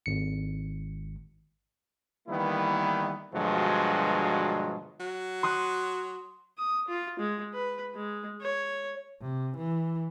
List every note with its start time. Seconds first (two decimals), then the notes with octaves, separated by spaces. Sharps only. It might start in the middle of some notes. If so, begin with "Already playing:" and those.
0.06 G#1 C#7
2.28 D#3 E3 G3 A#3 B3 E4
3.33 G2 B2 D3 F3 F#3 G#3
5.00 F#3
5.43 C6 D#6 F#6
6.58 D#6
6.88 F4
7.19 G#3
7.54 B4
7.95 G#3
8.41 C#5
9.21 C3
9.57 E3